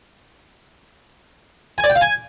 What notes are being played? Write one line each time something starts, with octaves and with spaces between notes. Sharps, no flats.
G#5
D5
G5
F5
G#5